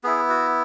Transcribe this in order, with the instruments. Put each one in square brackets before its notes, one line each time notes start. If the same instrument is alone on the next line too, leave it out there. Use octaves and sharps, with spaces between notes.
[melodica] B3 E4 G#4
F#4